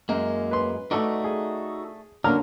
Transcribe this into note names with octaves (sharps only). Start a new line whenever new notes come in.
F#2 G#3 A#3
B4 C6
A3 D#4 F#4 A4 D5
G#4
D3 F#3 A#3 C#4 D4 A#5 F6